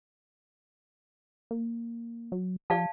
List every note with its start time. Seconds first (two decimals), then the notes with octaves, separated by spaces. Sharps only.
1.51 A#3
2.32 F#3
2.70 F3 D5 F5 A5